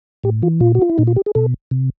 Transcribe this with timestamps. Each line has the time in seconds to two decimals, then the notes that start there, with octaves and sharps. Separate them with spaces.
0.24 A2 G4
0.42 E3 F4
0.60 A#2 F4
0.75 F#4
0.82 F4
0.90 E4
0.98 A#2 D#4
1.07 F4
1.16 G4
1.26 G#4
1.35 B2 A4
1.71 C3